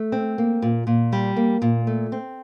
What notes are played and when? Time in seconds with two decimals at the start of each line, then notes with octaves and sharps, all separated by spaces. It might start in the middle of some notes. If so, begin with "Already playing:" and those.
Already playing: A3
0.12 C4
0.38 A#3
0.62 A#2
0.87 A#2
1.13 G3
1.36 A#3
1.62 A#2
1.87 A3
2.12 C4